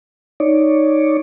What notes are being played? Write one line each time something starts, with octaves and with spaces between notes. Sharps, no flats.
D#4 C#5 D5